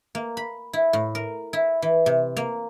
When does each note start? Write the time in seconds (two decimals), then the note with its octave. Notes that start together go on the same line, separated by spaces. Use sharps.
0.15 A#3
0.37 B5
0.73 E4
0.93 A2
1.15 A#4
1.53 E4
1.82 E3
2.06 C3
2.37 A#3